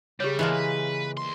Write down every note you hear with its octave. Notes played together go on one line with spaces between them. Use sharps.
C#3 G3 G4 C#5
E3 G#3 A#3 B3 A4
B4
D2 C6